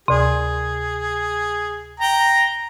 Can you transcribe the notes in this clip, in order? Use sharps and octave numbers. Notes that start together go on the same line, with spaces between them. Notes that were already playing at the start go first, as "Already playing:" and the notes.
D2 C3 G#4
G5 A#5